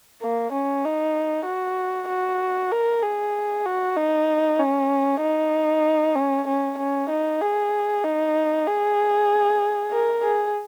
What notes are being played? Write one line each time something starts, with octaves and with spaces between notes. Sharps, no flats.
A#3
C#4
D#4
F#4
F#4
A#4
G#4
F#4
D#4
C#4
D#4
C#4
C#4
C#4
D#4
G#4
D#4
G#4
A#4
G#4